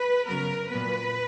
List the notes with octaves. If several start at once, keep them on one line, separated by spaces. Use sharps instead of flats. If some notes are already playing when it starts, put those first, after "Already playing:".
Already playing: B4
F#2 C#3 F#3 B3 A#4
A#2 F#3 B3 B4